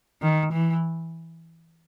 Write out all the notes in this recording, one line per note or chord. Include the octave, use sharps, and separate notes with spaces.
D#3
E3